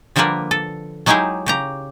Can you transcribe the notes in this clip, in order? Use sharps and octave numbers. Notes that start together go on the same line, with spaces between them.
D3 F3 G3 A#3 A#4 B4
A4
F#3 G#3 D#4 E4 G4 G#4
C#3 G4 A#5